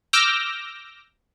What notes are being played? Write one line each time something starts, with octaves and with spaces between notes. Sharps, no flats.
D6 E6 F6 G6 A#6